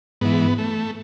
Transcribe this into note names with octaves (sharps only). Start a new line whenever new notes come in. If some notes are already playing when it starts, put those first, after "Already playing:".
G#2 E3 B3
A3